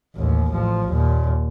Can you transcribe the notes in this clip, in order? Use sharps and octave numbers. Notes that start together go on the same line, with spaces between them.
A1 D#2
A1 F3
D#2 A#2